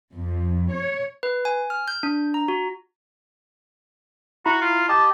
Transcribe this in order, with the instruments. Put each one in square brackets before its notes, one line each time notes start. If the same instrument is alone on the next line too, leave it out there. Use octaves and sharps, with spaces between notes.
[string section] F2
C#5
[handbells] B4
G#5
F6
G6
D4
A#5
F#4
[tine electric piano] E4 A#5 B5 [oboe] F#4
[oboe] F4
[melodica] G4 D#5 [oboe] A5